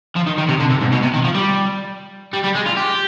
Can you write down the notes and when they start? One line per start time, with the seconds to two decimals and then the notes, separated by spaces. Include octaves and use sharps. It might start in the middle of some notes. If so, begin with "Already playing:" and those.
0.16 F3
0.26 D#3
0.38 D#3
0.48 C3
0.59 D3
0.70 C3
0.81 G#2
0.92 B2
1.03 C3
1.14 D#3
1.24 F3
1.35 G3
2.33 G3
2.44 G3
2.55 G#3
2.66 F4
2.77 G4